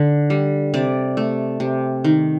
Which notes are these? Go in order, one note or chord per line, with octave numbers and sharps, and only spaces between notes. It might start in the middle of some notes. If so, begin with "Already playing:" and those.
Already playing: D3
G3
C3 D5
A3
C3
D#3